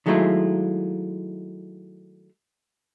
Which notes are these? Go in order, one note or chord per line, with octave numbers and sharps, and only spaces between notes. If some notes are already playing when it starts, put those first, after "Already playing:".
D#3 F#3 G#3 A3 E4 F4